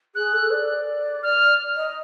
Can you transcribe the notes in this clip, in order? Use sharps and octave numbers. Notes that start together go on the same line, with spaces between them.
G#4 F#6
A4
D5
F6
D#5